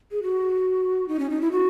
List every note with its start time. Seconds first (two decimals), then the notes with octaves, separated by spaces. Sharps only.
0.12 G#4
0.23 F#4
1.08 D#4
1.19 C#4
1.30 D#4
1.41 E4
1.52 F#4